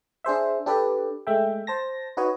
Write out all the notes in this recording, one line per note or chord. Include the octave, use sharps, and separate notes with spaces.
D4 G#4 C5 E5
D4 G4 A4 B4 D5
G#3 A3 E5 G5
C5 A5 A#6
D#4 F#4 B4 C#5 D#5